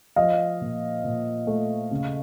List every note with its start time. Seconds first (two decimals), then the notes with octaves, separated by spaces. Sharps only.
0.16 F3 D#5 F5
0.61 A#2
1.04 A#2
1.47 A3
1.91 C#3